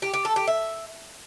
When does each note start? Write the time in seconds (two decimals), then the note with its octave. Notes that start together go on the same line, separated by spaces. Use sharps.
0.02 G4
0.14 G4
0.25 A4
0.36 G4
0.47 E5